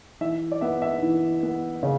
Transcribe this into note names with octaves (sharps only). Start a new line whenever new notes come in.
E3 E5
D5
B3 E5
E5
E3
B3
C#3